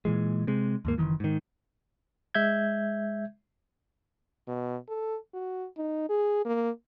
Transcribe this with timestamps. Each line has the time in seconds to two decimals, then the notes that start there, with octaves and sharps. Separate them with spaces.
0.05 A#2 E3 G#3
0.47 C3 G#3
0.85 D#2 G#2 A#3
0.98 F#1 C3 D#3 E3
1.20 G#2 D#3
2.35 G#3 E5 G6 G#6
4.48 B2
4.88 A4
5.34 F#4
5.77 D#4
6.09 G#4
6.45 A#3